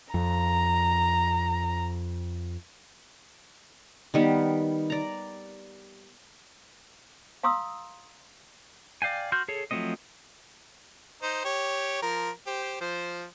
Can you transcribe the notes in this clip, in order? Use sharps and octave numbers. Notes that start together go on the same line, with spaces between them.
F2 A#5
D#3 G3 B3
D5 A#5
F5 A#5 C6 D#6 E6
D5 F5 G5 G#5
F#4 C6 F6 G6
G#4 A4 C#5
F3 F#3 A3 C4 D#5
D#4 C5
G4 C#5
F3 A#4
G4 C5
F3 C5